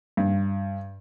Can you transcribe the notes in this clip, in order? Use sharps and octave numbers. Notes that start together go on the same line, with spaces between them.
G2